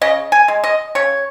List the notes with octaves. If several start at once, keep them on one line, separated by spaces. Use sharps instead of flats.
C#3 D#5
G#5
G#3
D#5
C#3 C#5